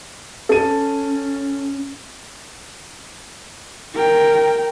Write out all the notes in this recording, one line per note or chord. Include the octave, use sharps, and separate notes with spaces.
C#4 A4 D#7
A#4 G5